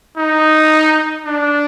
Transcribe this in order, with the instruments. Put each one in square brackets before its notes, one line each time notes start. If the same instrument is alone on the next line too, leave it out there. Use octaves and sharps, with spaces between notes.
[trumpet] D#4
D4